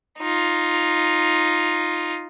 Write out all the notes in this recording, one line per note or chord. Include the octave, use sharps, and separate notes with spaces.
D#4 F4